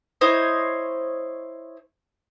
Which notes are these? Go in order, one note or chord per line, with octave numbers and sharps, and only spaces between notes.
E4 C5 C#5 D#5